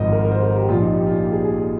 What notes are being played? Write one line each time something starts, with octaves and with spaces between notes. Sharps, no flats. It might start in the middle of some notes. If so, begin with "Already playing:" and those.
Already playing: G#1 G#2 F3 D#5
A#4
A#4
C5
A#4
G4
A#1 A#2 F3 F4
D#4
G4
F4
G4
G#4
G#4